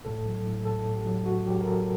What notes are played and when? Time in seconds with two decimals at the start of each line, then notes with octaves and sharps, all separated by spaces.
0.05 A2 A4
0.26 F#3
0.46 A2
0.65 A2 A4
0.85 A2
0.96 G4
1.05 F#3
1.26 A2 F#4
1.46 F#3 G4
1.61 A#4
1.66 F#3 A4